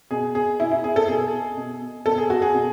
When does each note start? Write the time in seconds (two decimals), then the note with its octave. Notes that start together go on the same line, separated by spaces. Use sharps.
0.11 B2 G#4
0.35 G#4
0.60 B2 E4
0.71 E4
0.84 G#4
0.96 A4
1.08 B2 G#4
1.57 B2
2.06 B2 A4
2.18 G#4
2.30 F#4
2.42 G#4
2.54 B2